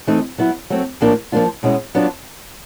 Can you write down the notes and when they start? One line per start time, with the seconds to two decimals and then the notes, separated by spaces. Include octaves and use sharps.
0.07 E3 A3 C4 D#4
0.38 F#3 B3 E4
0.70 F#3 A3 C4
1.01 A2 F3 A#3 D4
1.32 F3 A#3 D4 F4
1.63 B2 G#3 C#4 E4
1.95 F#3 B3 D4 F4